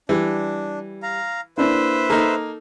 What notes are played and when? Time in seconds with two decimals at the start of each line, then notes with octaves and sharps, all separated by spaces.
0.09 E3 G3 D4 G4
1.03 F5 A#5
1.58 A#3 D4 E4 B4 C5 E5
2.10 A#3 D#4 A4